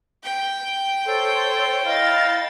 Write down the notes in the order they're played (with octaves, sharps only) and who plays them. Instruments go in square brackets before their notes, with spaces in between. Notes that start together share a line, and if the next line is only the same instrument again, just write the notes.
[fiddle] G5
[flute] A4 [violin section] C5 C#5
[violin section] E4 A6 [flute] D#5 [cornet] F5